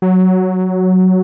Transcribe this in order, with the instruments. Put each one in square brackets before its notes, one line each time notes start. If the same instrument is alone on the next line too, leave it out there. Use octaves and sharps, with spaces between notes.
[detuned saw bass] F#3